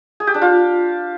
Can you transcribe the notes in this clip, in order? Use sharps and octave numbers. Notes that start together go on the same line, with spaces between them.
G#4
G4
D4
F4